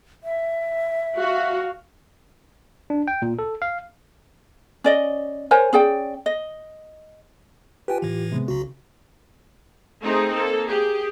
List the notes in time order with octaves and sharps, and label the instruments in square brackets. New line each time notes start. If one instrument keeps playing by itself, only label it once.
[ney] E5
[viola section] F#4 [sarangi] F5
[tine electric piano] D4
G5
A#2
A4
F5
[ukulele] C#4 D5 D#5
A#4 C5 C#5 G#5
C#4 G#4 D5 G5
D#5
[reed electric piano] F4 G4 [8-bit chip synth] B4 G5 G#5
[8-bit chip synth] A2 E3
[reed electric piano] C3 G#3 B3
[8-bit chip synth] B1 F#4 [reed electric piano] C#3
[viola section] A3 C4 D#4 G#4
A#3 A4
G4 G#4